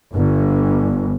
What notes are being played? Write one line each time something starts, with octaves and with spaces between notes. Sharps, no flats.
G1